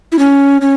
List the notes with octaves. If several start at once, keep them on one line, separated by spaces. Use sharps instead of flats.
E4
C#4
C#4